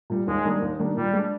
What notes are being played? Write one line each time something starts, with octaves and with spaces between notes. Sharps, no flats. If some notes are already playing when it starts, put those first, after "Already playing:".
A#2 G3
D#2 G#3
D#3 G3 A#3 D4
D#2
D#3 G3 A#3 D4
A#2 G3
G#3
D4